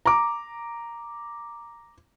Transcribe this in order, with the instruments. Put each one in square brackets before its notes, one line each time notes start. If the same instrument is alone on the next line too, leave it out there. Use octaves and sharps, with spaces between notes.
[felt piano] A#5 D6